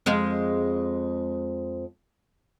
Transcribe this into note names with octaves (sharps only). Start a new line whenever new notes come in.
F2 G#3 F5